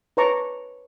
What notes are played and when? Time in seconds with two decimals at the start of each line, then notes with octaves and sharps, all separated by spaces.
0.17 B4 C#5 A5 A#5 C#6 D6